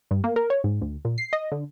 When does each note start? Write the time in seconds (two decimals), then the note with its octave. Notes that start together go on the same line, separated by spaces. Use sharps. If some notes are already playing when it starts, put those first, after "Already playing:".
0.11 G2
0.24 A#3
0.36 A#4
0.50 C#5
0.64 G#2
0.81 D2
1.05 A#2
1.18 C7
1.33 D#5
1.52 D3